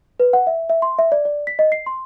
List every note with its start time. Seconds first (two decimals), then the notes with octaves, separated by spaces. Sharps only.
0.20 B4
0.33 F#5
0.47 E5
0.70 E5
0.82 C6
0.99 E5
1.12 D5
1.25 D5
1.47 B6
1.59 D#5
1.72 C7
1.86 C6